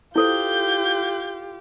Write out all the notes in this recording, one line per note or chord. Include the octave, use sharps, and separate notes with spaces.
E4 F4 G4 A4 C5 G6